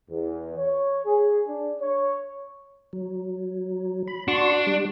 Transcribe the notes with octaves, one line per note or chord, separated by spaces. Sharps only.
E2
C#5
G#4
D4
C#5
F#3
B5
D4 F#4 C6 C#6
G3